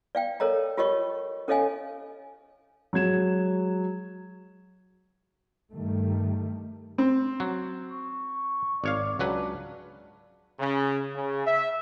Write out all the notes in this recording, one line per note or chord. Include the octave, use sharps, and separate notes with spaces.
D5 F5 G5
A4 A#4 C#5 D#5 A#5
F4 G4 A#4 C#5 D#5 C#6
C#4 A4 C#5 D#5 F5 G#5
F#3 G#3 G#6 E7
G2 D#3 G3 A3
C4
F#3
C#6
G#1 C#5 D5 F5
C#2 F#3 D4 B4
C#3
C#3
E5